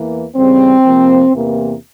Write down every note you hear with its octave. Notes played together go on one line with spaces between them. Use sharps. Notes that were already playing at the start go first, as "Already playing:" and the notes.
Already playing: E2 E3 A#3
E2 C#3 G3 C4
C3 F3 A#3
E2 C3 E3 A#3